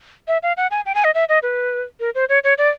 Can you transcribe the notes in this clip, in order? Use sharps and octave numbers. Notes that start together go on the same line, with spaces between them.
E5
F5
F#5
G#5
G5
G#5
D#5
E5
D#5
B4
A#4
C5
C#5
C#5
D5